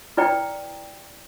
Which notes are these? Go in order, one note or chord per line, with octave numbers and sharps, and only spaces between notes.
E4 B4 D5 G5 A#5